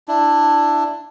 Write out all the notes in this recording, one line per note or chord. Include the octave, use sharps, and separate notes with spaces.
D4 E4